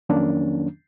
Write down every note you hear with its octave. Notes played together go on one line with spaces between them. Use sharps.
F2 D#3 F#3 A#3 C#4 D4